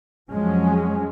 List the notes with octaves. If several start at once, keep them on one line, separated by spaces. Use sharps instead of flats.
F2 F3 F#3 G#3 C#4